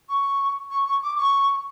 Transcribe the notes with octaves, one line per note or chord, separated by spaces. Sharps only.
C#6
C#6
C#6
D6
C#6